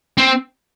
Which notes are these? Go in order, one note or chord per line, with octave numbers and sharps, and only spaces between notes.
C4